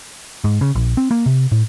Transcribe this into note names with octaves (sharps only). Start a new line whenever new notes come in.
G#2
C#3
A#1
C4
A#3
C3
A2